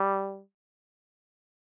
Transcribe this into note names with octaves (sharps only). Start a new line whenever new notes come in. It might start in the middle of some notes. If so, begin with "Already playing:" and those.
Already playing: G3